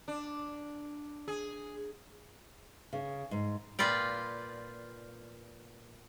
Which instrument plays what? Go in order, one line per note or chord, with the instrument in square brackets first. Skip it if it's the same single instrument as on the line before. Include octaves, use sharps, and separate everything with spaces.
[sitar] D4
G#4
[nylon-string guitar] C#3
G#2
[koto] A#2 F4 B4 D5 G5